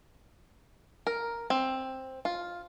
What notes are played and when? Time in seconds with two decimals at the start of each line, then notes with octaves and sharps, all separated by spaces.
1.07 A#4
1.50 C4
2.25 F4